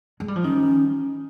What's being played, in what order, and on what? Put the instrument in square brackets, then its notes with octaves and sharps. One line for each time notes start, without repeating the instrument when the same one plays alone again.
[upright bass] G#3
G3
F3
[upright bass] D#3 [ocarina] C#4